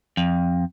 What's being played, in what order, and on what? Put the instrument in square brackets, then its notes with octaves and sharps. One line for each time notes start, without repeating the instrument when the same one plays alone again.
[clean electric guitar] F2